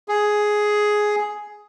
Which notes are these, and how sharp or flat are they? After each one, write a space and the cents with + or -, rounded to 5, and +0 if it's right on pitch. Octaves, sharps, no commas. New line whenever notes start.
G#4 +5